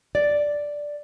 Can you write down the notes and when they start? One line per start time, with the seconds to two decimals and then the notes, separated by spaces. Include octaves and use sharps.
0.15 D5